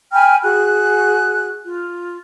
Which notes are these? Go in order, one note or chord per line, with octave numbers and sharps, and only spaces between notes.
G5 G#5 B5 F6
F#4 G#4 F#6
F4